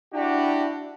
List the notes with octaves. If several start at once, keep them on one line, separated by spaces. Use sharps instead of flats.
D4 E4 F#4 G4